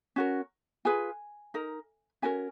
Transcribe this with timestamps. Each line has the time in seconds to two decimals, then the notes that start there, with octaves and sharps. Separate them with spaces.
0.16 C#4 F#4 A#4
0.85 F4 G#4 B4 G#5
1.54 D#4 A#4
2.22 C#4 F#4 A#4 G#5